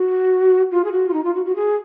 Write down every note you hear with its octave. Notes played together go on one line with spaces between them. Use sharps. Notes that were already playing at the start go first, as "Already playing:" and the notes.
Already playing: F#4
F4
G#4
F#4
F4
D#4
F4
F#4
F#4
G#4